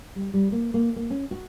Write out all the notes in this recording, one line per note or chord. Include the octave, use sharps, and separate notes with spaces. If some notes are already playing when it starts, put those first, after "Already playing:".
G3
G3
A#3
A#3
A#3
C#4
F#4